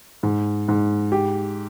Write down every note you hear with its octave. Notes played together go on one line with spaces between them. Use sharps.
G#2
G#2
G4